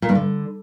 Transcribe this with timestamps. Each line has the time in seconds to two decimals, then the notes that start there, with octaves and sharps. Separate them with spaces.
0.02 A#2
0.09 G2
0.15 D3